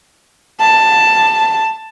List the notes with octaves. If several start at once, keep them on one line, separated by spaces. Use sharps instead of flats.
A5